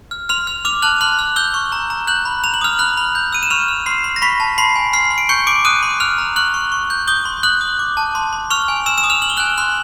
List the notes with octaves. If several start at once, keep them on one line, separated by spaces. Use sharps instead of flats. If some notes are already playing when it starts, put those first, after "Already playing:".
F6
C6 F6 F7
F6
D6 F6 F7
A5 F#6 F#7
C6 F#6 F#7
F6
E6 G6 G7
C#6
A#5
A#5
F#6 G6 F#7
B5
A#5 F7
F#7
D#6 F6 F7
B5 F#6 F#7
B5
G6
E6 D#7
E7
C#6 F6 F7
F6
C6 C7
C6
A#6
B5 C#6 B6
A5
B5 C6 C7
G#5
C6 F6 C7
C6
D7
C#6 G6 C#7
C6 D6 D7
D#6 F#6 D#7
C6
F6 F#6 F7
A#5
C#6 F#6 F#7
C#6
C#6
G6
D#6 G6 G7
C6
D#6 F#6 F#7
D#6
D6
A5
C6
C6
C#6 F6 F7
G#5
C6 E6 E7
E6 E7
D#6
F6 F7
E6 F#7
G7
G#5 F#6 F#7
C6 F#6 F#7